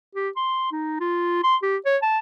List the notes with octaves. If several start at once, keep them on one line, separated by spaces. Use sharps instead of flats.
G4
C6
D#4
F4
C6
G4
C#5
A5